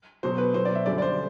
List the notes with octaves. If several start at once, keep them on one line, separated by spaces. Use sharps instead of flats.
B2 F#3 C5
B4
B2 F#3 C5
D5
E5
F#2 D3 G3 D5
D5
C5